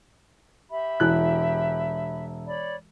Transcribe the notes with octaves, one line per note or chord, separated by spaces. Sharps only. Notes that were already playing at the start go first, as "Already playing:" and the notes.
G4 E5 B5
E1 E4 F#6
C#5 D5 B5